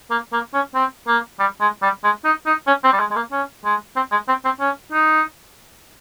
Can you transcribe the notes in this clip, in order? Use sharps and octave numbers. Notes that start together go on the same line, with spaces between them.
A#3
A#3
C#4
C4
A#3
G3
G#3
G3
G#3
D#4
D#4
C#4
C4
G3
G#3
G#3
A#3
C#4
G#3
C4
G#3
C4
C4
C#4
D#4